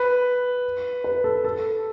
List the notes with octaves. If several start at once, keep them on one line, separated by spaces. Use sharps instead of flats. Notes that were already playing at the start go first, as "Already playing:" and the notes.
Already playing: B4
B4
A4
A4